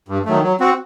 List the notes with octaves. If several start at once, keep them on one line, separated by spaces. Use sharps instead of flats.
G2
D#3 F#3 A3
F#3
C4 F#4